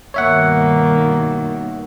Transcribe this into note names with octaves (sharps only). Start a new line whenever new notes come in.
G2 B2 D#3 A#3 C#5 E5 F#5